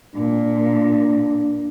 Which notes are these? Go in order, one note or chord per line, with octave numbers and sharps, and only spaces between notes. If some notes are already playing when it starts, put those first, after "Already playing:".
A#2 D4